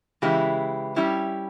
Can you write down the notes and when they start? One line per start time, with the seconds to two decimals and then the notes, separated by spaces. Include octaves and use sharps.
0.22 C#3 E3 G#3 E4 G4
0.96 G3 C#4 E4 G4